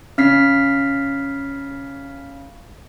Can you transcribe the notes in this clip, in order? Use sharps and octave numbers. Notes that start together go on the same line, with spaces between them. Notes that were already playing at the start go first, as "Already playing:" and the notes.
C#3 F6 B6 C7